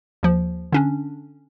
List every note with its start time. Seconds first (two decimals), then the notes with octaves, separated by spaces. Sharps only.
0.23 D#2 F3
0.73 D3 C#4 D4